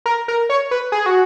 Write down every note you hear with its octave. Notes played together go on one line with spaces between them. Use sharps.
A#4
A#4
C#5
B4
G#4
F#4